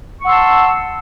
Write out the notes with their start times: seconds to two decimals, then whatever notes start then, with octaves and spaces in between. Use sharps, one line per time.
0.21 C#6
0.23 F#5
0.26 E6
0.29 C6
0.31 A5